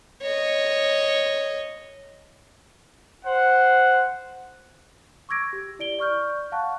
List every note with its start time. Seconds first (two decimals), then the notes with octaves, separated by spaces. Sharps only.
0.22 C#5 D#5
3.25 C5 F#5
5.29 C#6 D6 E6 G#6 A#6 D7
5.53 G4
5.79 E4 D5 D7 G7
5.99 D5 C#6 F6 G6
6.52 F5 F#5 A5 C#6 F#6